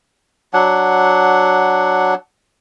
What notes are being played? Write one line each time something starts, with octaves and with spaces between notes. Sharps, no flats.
F#3 D4 F#5